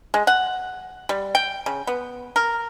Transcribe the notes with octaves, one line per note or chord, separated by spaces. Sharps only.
G#3
F#5
G3
G5
C#3
B3
A#4